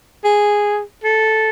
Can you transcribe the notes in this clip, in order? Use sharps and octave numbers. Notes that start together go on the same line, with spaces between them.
G#4
A4